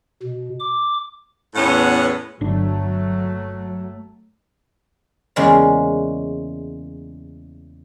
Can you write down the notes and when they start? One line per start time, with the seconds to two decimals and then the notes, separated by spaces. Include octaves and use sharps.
0.23 B2
0.60 D6
1.55 E2 A2 B3 C#4 F#5
2.41 G1 F#3 A3 D4
5.36 E2 C#3 G#3 A#3 D5 F5